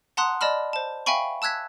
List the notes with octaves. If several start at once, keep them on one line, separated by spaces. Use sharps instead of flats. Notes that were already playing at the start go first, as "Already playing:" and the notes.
F#5 A5 A#5 C6 D#6 F#6
D5 D#5 A5 B5 F6
C5 A5
E5 F5 G5 G#5 B5 C#6
A5 E6 F#6 G#6 B6